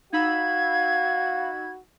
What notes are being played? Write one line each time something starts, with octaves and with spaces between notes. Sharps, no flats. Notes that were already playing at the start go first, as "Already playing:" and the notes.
D#4 F#4 F5 B5 E6 G#6